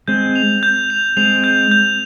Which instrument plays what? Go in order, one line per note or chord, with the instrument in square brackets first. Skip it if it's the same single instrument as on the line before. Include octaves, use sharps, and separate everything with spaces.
[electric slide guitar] G#3 C4 [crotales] G6
[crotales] F7
G6
F7
[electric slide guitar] G#3 C4 [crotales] F7
[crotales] G6
G6